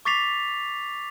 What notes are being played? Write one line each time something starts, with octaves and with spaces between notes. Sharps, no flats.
C#6 D6 A6 B6 C7 F7